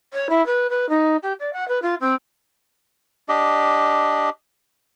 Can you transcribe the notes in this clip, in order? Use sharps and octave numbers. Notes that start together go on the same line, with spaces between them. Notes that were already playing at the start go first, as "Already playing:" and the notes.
C#5
E4
B4
B4
D#4
G4
D5
F#5
B4
F4
C4
D4 G4 D#5